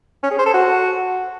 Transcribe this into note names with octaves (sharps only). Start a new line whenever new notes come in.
C#4
G#4
C5
A4
F#4